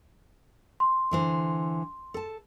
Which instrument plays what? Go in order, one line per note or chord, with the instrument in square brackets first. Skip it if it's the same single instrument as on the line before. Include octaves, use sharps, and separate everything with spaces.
[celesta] C6
[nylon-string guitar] D3 E3 C5
A4 A5